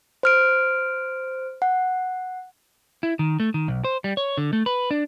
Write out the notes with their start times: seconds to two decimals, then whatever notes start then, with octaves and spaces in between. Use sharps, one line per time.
0.23 C5 F6 D7
1.62 F#5
3.03 E4
3.19 D#3
3.40 A3
3.54 D#3
3.68 B1
3.84 C5
4.04 G3
4.17 C#5
4.37 D3
4.53 A3
4.66 B4
4.91 D4